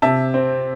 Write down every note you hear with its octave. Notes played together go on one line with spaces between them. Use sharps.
C3 E5 A5
C4